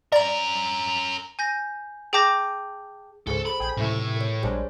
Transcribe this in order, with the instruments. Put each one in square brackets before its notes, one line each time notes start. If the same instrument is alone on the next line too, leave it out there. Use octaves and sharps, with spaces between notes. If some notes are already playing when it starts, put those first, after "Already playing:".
[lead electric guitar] C#4 A#4 [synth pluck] D5 A#5
[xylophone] G#5 G6 A#6
G#4 G5 A5 D6 G6 A#6
[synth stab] C#2 G#2 C#3 [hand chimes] G#4 C5 [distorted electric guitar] A4
[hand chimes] A4 C5 [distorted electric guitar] B5 [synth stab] D7
[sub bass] A#1 [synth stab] G#4 G5
[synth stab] C#2 E3 A3 [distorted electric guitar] A2 [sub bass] C3
[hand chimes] A#4 C#5
[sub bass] A#1 [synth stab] G3 G#3 D4 [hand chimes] G#4 C5 C#5